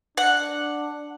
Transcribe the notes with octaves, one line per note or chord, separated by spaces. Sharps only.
D4 F#5